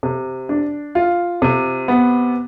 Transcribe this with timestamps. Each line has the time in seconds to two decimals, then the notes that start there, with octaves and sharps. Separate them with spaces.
0.03 C3
0.49 D4
0.95 F4
1.42 C3
1.88 B3